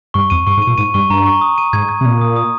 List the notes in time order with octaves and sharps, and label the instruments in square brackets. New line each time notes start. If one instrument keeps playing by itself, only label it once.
[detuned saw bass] G2 [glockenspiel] C#6
[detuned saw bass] F2 [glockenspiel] D#7
[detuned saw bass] G2 [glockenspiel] C#6
[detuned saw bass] G#2
[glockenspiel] D#7
[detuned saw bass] A#2
[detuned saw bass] G#2 [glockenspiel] D#7
[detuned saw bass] G2 [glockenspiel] C#6
[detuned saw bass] G2 [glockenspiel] A#5
[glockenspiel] C#6
D#6
D#7
[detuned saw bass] G#2 [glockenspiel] G#6
[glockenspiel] G#6
[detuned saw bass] C3
[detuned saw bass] A#2 [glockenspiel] G#6
[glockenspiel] D#6
D#6